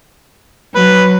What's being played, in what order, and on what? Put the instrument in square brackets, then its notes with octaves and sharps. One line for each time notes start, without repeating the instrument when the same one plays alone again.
[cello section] F#3 [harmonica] B4